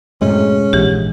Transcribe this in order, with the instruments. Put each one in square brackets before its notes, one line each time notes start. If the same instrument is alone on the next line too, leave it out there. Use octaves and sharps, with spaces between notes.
[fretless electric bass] F#2 A2 C3 [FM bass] G#3 [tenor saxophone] C#4
[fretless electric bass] A#1 G#2 [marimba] E3 G4